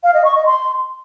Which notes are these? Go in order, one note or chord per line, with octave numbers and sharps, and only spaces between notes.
F5
D#5
C#6
D#5
C6